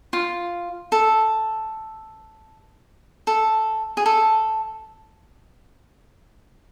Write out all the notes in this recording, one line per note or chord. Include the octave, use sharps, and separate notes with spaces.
F4
A4
A4
G#4
A4